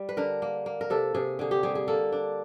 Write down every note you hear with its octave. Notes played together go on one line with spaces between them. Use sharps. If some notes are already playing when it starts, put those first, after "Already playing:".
Already playing: G3
B4
D3 A#4
A#3
A#3
A#4
C3 A4
C3 G#4
D3 G#4
G4
G3 G#4
G#4
A#3 A4
D4